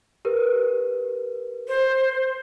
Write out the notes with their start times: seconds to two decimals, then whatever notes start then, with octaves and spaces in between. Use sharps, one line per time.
0.25 G4 A#4 B4
1.68 C5